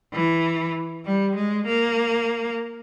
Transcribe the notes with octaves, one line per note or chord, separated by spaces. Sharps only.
E3
G3
G#3
A#3